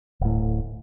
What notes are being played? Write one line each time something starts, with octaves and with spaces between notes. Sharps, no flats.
D1 A2